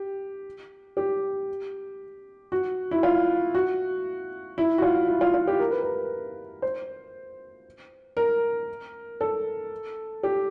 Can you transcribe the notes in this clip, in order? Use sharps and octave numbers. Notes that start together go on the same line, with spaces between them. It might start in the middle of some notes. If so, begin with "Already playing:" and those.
Already playing: G4
G4
F#4
E4
F4
F#4
E4
F#4
F4
E4
F4
F4
G4
A#4
B4
A#4
C5
A#4
A4
G4